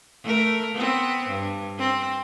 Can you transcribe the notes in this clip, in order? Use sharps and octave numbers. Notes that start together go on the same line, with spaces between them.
A3 A#4
B3 C4
G2
C4